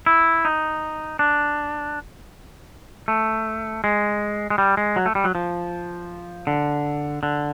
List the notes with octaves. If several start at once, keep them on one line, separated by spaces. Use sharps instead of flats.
E4
D#4
D4
A3
G#3
G#3
G3
G#3
F#3
A3
G3
F#3
F3
D3
D3